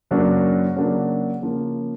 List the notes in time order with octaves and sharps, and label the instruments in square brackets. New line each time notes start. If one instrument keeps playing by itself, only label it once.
[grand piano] F#2 C#3 F#3 A#3 D4
C#3 F#3 A#3 D4 F#4
C#3 F3 A#3